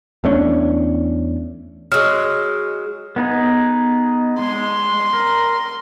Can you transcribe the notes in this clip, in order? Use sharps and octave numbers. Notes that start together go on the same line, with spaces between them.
E2 A3 C#4 D4
F#3 G#3 F6
B3 D#4 G#4
G#3 C6
A#4